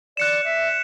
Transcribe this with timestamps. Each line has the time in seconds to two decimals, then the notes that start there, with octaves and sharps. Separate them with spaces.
0.17 D5 F#6 C#7 E7
0.44 E5